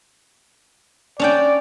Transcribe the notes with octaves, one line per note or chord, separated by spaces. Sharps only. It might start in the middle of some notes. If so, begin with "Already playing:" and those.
C#4 D4 D5 G5